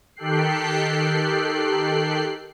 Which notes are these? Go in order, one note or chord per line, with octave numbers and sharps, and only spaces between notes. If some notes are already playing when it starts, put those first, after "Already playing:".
D#3 G4 A4 G5 F#6 C7